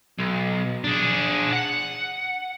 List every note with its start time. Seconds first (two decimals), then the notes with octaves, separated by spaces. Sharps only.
0.19 B1
0.84 D4 G#4
1.53 F#5